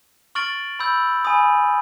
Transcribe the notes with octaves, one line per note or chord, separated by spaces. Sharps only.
C#6 F6 A6 D7 F#7
B5 E6 G6
G#5 B5 D#6